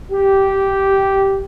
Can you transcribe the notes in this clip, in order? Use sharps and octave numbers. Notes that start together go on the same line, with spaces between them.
G4